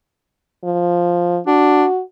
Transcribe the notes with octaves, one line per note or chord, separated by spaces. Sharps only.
F3
D4 F#4